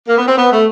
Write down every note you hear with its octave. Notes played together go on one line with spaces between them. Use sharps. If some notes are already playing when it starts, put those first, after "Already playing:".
A#3
B3
C4
B3
A3